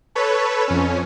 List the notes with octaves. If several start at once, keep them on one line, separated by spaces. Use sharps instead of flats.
A4 B4 C#5
F2 C#4